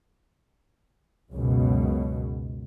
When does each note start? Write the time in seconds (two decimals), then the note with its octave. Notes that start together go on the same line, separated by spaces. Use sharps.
1.33 C#2 F#2 B2